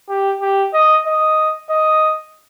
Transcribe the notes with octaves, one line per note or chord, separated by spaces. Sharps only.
G4
G4
D#5
D#5
D#5